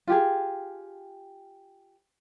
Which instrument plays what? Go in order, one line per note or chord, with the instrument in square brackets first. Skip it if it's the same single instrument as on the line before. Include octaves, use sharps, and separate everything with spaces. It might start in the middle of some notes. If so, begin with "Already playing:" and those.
[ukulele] F4 G4 G#4